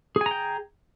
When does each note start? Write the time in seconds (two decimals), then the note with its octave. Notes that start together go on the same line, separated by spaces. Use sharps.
0.16 G#4
0.21 G#5
0.26 A#5
0.31 G5